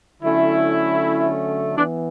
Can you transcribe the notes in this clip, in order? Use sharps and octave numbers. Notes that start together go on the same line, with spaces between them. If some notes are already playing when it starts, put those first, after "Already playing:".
D3 F#3 A3 C#4 E4
E3 B3 D4